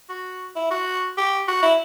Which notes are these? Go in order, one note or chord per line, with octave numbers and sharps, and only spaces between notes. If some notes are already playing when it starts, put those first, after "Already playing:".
F#4
E4
F#4
G4
F#4
E4